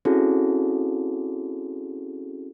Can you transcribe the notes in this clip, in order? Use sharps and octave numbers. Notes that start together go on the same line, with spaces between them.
C4 C#4 E4 F#4 G#4 A4